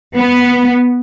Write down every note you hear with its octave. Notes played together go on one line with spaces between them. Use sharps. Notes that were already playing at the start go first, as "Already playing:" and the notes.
B3